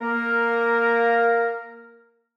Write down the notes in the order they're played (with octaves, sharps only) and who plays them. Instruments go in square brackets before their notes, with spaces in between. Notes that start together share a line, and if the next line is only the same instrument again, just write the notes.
[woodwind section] A#3 A#4